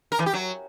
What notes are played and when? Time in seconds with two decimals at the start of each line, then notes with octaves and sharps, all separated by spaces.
0.12 A#4
0.19 E3
0.26 G4
0.33 F#3